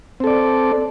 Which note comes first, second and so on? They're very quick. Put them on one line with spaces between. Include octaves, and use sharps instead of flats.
C4 A4 D5